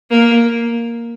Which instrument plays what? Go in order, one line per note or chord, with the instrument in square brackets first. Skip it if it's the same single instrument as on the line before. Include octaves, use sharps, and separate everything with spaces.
[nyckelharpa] A#3